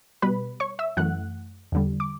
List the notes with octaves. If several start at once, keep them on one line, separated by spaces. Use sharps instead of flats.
B2 G3 B4 B5
C#5 C#6
E5 E6
F#2 E3 A3 F#5 F#6
E2 D3 G3
D6